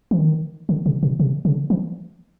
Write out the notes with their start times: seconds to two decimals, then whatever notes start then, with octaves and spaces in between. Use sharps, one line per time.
0.11 E3
0.19 D#3
0.69 D3
0.86 C3
1.03 B2
1.20 C3
1.45 C#3
1.70 E3